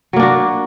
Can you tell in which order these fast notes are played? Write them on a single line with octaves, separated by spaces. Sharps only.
F#3 A#3 D4 F#4